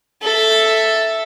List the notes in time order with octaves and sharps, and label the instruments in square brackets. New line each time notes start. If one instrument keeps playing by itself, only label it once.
[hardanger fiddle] A4 E5